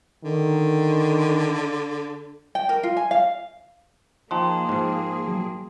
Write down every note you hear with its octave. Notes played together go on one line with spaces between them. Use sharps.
D3 D#3
G5
A#4
F4
G#5
F5
F3 A#3 D#4 G#4 G5 A5 C6
G#2 F3
F#3